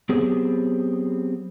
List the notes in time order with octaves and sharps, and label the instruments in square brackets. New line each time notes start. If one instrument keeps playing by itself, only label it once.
[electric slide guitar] F#3 B3 C4 G4 G#4